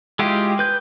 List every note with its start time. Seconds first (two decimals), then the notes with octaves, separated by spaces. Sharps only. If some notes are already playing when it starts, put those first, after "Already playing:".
0.19 G#3 E4 F4 G4
0.59 B4 G6